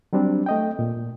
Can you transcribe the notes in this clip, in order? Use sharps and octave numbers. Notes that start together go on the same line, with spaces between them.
F#3 G3 C4 D4
A3 D#5 G5
A#2